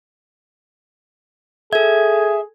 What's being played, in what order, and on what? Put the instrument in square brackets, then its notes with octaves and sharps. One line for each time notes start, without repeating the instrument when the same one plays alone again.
[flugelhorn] G#4 [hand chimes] A4 G#6 [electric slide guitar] E5